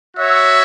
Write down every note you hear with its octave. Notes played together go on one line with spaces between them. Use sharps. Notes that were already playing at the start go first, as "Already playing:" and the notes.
F#4 C#5 E5